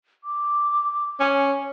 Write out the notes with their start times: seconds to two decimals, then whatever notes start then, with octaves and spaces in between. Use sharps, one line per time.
0.24 D6
1.20 C#4